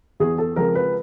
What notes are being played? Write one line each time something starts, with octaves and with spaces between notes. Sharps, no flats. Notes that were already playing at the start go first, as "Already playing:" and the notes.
E2 G#4
A4
C#3 F3 G#3 C4 A#4
B4